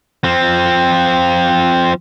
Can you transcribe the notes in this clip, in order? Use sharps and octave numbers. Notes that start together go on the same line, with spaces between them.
F3 C4